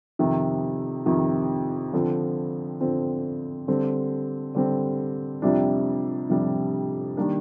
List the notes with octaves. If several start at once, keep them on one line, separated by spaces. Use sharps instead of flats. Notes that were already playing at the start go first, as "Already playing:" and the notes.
F2 C3 D#3
F2 C3 D#3
D3 F3 C4
D3 F3 C4
D3 G3 C4
D3 G3 C4
F2 C3 G3 D4
F2 C3 G3 D4
D#3 G3 A#3 D4